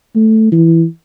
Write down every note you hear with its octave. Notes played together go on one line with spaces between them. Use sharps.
A3
E3